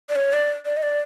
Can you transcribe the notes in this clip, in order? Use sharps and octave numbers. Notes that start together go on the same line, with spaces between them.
D5
C#5
D5
D5
D#5
D5